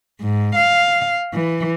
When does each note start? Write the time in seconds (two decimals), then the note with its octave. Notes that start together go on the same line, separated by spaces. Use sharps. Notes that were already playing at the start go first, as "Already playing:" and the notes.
0.21 G#2
0.55 F5
1.33 E3